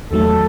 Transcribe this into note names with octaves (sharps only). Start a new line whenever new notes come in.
E2 D#3 F#3 A3 A4